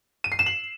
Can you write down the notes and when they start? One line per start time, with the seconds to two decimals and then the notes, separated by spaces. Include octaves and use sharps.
0.24 D#7
0.32 C7
0.39 E7
0.46 F#7